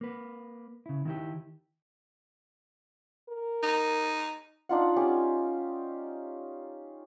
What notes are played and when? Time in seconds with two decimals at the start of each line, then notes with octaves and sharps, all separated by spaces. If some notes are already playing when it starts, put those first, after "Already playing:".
0.01 A#3 B4
0.86 C#3 E4
1.05 D#3 E4 G4
3.29 A#4
3.63 D#4
4.69 D4 D#4 F4 F#5
4.96 C#4 G4